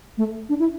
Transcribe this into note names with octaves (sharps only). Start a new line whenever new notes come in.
A3
D4
E4